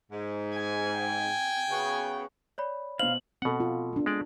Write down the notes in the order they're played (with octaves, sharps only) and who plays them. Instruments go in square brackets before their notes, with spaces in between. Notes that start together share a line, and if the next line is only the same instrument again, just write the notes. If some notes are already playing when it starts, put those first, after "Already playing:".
[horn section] G#2
[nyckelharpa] G#5
[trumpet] G5
[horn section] C#3 B3 F#4
[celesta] C#5 D5 B5
[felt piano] B2 C5 [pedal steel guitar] F5 [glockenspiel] F#7
[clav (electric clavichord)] B2 F#5 [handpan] C4 A4
[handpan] F4
B3 D4
[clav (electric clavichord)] G#3 D5